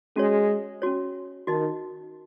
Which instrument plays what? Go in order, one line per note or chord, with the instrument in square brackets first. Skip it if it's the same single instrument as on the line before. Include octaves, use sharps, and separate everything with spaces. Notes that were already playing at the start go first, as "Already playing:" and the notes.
[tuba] G#3 [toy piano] C#4 F#4 C#5
[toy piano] C#4 F#4 C#5
[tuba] D#3 [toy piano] D#4 F#4 D#5